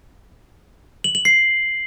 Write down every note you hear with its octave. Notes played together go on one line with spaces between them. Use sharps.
F#7
F#7
C7